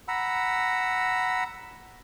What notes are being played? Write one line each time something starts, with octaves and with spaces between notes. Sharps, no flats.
F#5 A#5 B5 E6